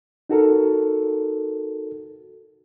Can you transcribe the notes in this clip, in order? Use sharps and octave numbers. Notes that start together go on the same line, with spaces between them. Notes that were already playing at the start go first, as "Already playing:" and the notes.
D#4 F#4 A4 A#4